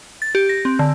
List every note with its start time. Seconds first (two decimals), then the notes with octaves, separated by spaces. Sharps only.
0.22 A6
0.35 G4
0.49 A#6
0.65 C4
0.79 D3